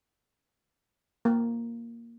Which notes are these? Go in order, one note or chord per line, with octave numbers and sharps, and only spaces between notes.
A#3